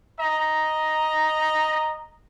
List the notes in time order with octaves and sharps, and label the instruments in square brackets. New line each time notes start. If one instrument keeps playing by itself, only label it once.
[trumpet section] D#5 A#5